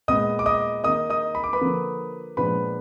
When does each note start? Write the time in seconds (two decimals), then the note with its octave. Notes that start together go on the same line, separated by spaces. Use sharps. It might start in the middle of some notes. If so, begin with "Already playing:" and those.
0.08 A#2 G#3 B3 D#5 D#6
0.39 D6
0.46 D#5 D#6
0.84 D#3 A#3 D#4 D#5 D#6
1.10 D#5 D#6
1.35 B5
1.44 D6
1.53 B4 B5
1.61 D3 F3 A#3
2.37 A#2 F3 G#3 B3 D4 B4 B5